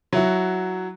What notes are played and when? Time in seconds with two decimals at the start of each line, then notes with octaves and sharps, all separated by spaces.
0.13 F#3 E4 F#4